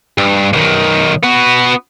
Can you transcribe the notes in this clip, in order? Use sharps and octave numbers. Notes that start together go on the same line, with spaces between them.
G2
B1 D#3
B3 F#4